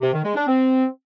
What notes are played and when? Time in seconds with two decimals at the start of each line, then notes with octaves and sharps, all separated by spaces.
0.01 C3
0.13 D#3
0.24 G#3
0.35 D4
0.47 C4